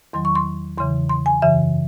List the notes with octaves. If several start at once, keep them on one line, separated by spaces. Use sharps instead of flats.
E2 D#3 F#3 C6
C#6
C6
E2 C#3 E3 C6
C6
G#5
F#2 C#3 E3 E5